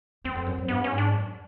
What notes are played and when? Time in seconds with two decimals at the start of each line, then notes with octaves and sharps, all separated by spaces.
0.24 E2 C4
0.35 F2
0.46 F#2
0.58 F#2
0.68 G2 B3
0.84 C#4
0.91 G#2
0.98 D4
1.14 F#2